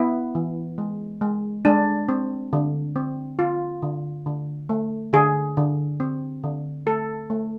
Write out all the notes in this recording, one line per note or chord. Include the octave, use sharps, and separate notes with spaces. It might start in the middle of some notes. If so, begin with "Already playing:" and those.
Already playing: B3 E4
E3
G#3
G#3
G#3 D4
C4
D3
C4
D3 F4
D3
D3
A3
D3 G#4
D3
C4
D3
A3 A4
A3